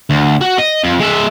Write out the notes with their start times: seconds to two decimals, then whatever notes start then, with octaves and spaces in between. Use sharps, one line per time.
0.10 D2
0.41 F#4
0.58 D#5
0.84 F2
1.00 G#3 E5